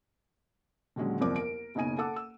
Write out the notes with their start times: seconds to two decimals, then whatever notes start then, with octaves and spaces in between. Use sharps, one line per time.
0.96 D#1 D3 F#3 G#3 C#4
1.20 G1 C2 F2 A#4 D5 D6
1.36 A#4 D7
1.75 F#1 B2 D#4 D#5 G#5 D#7
1.98 A4 F#5 A5 D6 E6
2.16 E6